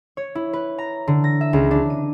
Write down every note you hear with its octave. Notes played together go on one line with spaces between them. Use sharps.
C#5
E4
B4
A#5
D3
A#6
E5
C#2
D4
D#7